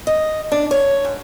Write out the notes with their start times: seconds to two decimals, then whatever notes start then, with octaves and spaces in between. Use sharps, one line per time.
0.07 D#5
0.52 D4
0.71 C#5
1.05 G#2